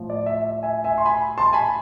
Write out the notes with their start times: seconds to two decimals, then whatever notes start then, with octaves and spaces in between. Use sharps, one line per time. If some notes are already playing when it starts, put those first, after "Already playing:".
Already playing: A2 F3
0.10 D5
0.26 E5
0.42 E5
0.63 E5 G#5
0.84 E5 G#5
0.98 C6
1.05 G#5 B5
1.38 A5 C6
1.53 G#5 B5